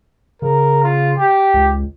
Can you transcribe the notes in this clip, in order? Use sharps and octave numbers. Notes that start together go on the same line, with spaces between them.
C#3 A#4
F4
G4
C#2